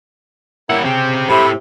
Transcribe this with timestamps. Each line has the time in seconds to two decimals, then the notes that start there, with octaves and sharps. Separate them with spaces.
0.70 G3 A#3 C#4 E4 F#5
0.85 C#3 C4 G4
1.29 A2 C3 B5